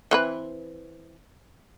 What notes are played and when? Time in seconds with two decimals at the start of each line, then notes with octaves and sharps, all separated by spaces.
0.11 E3 C4 B4